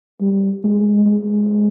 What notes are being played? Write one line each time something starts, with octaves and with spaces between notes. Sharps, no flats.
G3
G#3
G#3